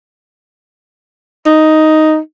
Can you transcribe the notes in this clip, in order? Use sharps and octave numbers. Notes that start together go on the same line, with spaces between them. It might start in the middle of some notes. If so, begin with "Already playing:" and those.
D#4